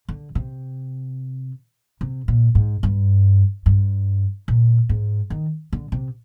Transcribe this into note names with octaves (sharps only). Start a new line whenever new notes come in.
D3
C3
C3
A#2
G#2
G2
G2
A#2
G#2
D#3
D3
C3